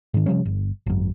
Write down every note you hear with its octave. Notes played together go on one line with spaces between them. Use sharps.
G#2 D#3
C3 F3 G3 C#4
G1
G#1 F#2